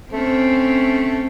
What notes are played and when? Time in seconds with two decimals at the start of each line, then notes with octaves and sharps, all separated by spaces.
0.13 A3 C4 C#4